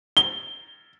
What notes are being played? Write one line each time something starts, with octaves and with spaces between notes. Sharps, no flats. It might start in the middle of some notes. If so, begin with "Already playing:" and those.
G7